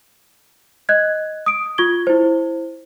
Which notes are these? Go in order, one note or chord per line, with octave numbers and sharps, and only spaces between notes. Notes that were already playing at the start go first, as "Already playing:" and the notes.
D#5 F#6 G#6
D#6 D7
F4 C#6 G#6 G7
E4 C5